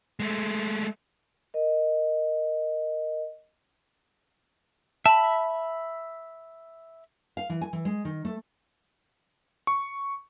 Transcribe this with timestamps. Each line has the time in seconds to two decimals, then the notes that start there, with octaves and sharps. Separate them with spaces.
0.20 G#3 A3
1.54 A#4 D#5
5.06 E5 A5 B5
7.37 F5
7.50 E3
7.61 G#5
7.73 E3
7.85 G#3
8.05 D#3
8.25 A3
9.67 C#6